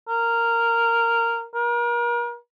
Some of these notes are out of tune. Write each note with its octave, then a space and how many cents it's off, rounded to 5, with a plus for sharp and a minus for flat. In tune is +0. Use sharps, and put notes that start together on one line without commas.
A#4 -10
A#4 +40